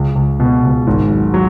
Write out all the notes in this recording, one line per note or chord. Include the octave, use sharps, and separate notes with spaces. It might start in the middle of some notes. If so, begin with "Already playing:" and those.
Already playing: C#2
C#2
B2
C#2
G#1
F#3
F#3